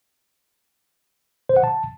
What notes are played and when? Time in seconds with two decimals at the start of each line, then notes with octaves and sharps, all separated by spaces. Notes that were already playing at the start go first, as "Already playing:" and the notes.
1.49 C5
1.57 F#5
1.64 A5